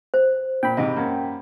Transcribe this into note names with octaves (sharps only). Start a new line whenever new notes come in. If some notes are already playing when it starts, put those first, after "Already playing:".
C5
A#2 G5 B5
G#2 C3 D#5
F#2 A#3